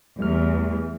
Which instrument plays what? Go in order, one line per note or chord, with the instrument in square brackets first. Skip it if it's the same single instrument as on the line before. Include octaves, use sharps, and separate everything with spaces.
[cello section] E2 [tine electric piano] G3 A3 F6